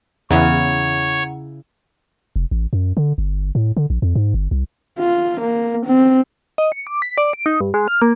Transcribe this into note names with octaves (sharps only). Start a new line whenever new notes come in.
E2 C#3 E4 C#5 F#5 G#5 A#5
F1
A1
F#2
D3
G1
A2
D3
A#1
F2
G#2
G1
C2
F4
A#3
C4
D#5
C#7
D6
B6
D5
D7
D#4
G2
G#3
F6
A#3